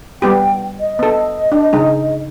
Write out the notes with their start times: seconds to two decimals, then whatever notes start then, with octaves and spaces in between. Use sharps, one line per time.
0.22 G3 B3 G4 G5
0.80 D#5
0.99 B3 A4
1.52 D4
1.73 C#3 G#3 D#4